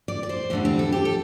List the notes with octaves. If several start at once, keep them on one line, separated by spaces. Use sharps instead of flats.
D5
D5
C5
E2 D3 G3 A3
C4
A4
G4
A4